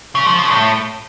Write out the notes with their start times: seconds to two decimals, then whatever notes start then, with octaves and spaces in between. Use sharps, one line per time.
0.15 C#3
0.27 F3
0.39 C#3
0.51 A2